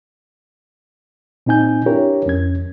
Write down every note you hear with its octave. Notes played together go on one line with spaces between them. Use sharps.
A#2 C4 D#4 G#5 G6
D4 E4 G4 A#4 C#5
F2 C#4 G#6